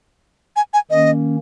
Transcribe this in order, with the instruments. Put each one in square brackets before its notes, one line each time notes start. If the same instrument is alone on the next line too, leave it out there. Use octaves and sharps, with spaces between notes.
[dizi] G#5
G#5
[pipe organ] D#3 A#3 C#4 [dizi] D#5